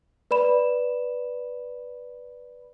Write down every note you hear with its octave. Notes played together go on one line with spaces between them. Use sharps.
B4 D5 B5 E7